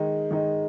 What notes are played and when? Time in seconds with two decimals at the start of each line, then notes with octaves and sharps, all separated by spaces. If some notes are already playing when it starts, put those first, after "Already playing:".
Already playing: D#3 G#3 D#4
0.31 D#3 G#3 D#4